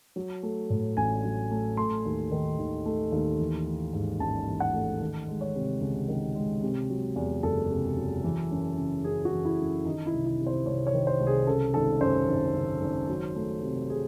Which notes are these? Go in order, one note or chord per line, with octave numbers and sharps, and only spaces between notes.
F#3
A3
A2
A1 G#5
F#3
A3
A3 C6
D#2
D#3
D#2
A3
D#2
E3
A3
G#2
A1 A5
E3
F#5
A3
D#3
G#3
C#5
C3
C#2
D#3
G#3
C3
F#3
E2
F#1 A4
C3
F#3
E3
F#2
C#3
F#2 G#4
F#4
E3
E4
F#2
D#3 D#4
E4
C2
E4
C3
C5
C2 C#5
C#5
D#3
C5
C2
G#4
C#3 A4
G#1 A4
F#2 C5
G#1
C#3
G#1
F#3
A3
C3
G#4